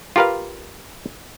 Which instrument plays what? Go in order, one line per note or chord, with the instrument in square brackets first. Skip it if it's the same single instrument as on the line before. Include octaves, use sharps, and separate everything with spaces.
[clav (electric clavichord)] F4 G4 A#4 B4 F5